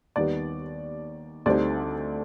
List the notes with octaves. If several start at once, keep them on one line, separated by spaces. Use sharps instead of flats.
D#2 D#3 G3 B3 D5
D2 D3 G3 C4 D#4 D5